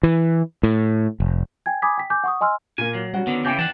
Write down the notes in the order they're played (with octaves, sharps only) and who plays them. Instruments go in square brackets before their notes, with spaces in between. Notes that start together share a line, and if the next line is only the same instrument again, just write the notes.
[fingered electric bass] E3
A2
F1
[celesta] G5 G#5 G#6
G#5 B5 D6 D#6 G#6 B6
G5 B6
G#5 D6 G6
F#5 C#6 D#6
D#5 G#5 C6 E6 F6
[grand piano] A#2 A#3 [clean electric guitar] G#5
[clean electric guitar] F#3
[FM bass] G3 [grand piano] C#4 F#4
[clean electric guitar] D3 D#3 [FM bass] B3
[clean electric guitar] C#3 E3 [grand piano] G5 D6 G6
[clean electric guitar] E2 F#5 A5 [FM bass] E3